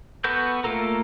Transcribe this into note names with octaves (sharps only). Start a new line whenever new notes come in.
B3 F#4 A4 B4 G6
A3 A#3 F4 A4 A#4